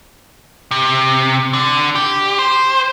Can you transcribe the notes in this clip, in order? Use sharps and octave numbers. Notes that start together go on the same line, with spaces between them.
C3
D3
G4
C5